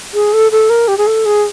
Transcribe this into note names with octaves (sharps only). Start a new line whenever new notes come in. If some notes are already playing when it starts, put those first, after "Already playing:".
G#4
A4
A4
A#4
G4
G#4
A4
G#4